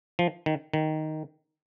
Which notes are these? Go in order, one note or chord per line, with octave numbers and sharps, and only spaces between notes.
F3
D#3
D#3